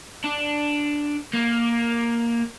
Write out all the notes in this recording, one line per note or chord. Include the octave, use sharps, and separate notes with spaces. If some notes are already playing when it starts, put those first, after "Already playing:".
D4
A#3